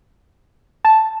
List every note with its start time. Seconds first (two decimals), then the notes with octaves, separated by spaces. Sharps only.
0.85 A5